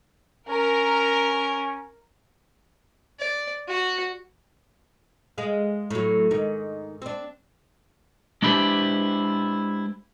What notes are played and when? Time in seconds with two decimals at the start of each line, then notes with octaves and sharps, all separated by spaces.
0.50 C#4 A#4
3.19 D5
3.67 F#4
5.38 G#3 G#4 F5
5.90 A2 F#3
6.31 G#2 D#3
7.02 C4 D4
8.42 G#3 D4 E4 G4 B4 C5